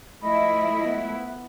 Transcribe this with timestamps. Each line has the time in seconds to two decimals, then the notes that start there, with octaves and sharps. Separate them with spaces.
0.22 F3 A3 E4 D#5 B5
0.83 B3